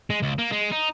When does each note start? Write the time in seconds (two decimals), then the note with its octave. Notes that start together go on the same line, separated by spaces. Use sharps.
0.10 G#3
0.22 C#2
0.38 A#3
0.52 G#3
0.72 D#4